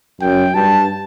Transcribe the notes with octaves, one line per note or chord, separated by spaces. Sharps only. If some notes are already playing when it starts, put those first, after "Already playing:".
F#2 G5
G2 A5